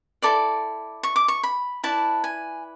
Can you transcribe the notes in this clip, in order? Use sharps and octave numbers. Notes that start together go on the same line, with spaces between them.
E4 A4 D5 D6
C#6
D6
C#6
B5
E4 B4 D5 A5
G#5